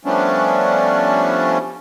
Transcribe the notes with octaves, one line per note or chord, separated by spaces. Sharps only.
F3 G3 A3 B3 C#4 D4